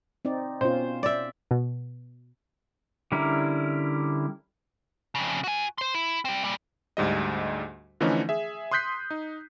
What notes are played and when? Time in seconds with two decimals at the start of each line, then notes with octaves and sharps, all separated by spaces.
0.25 C4 D#4 D5
0.61 B2 C#4 F4 C5
1.03 D5 E5
1.51 B2
3.12 D3 G3 C#4 E4 A#4
5.15 F2 C#3
5.44 F#4 G#5
5.78 C5 C6
5.95 E4
6.25 G3 C4
6.44 A#2 G3
6.97 D2 G#2 G3 D#5
8.00 D3 E3 F3 A3 C#4 D#4
8.29 G#4 E5
8.71 C6 D#6 F#6 G6 B6 C7
9.10 D#4